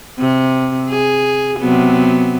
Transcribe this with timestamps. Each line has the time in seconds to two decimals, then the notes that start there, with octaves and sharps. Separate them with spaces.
0.19 C3
0.89 G#4
1.59 C3 F#3 B3